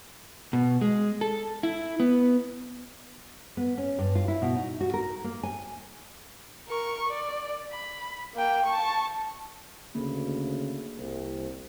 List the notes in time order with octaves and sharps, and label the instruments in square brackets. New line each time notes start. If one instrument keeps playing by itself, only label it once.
[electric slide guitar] B2
G#3
A4
E4
B3
[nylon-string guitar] B3
C#4
G2
F4
E4
B2
D#4
F#4
A#4
A#3
G#5
[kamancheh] A#4 C#6
D5
B5
A#3 G5
A5 C#6
[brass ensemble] D2 C#3 [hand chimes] A#3
[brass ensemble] C2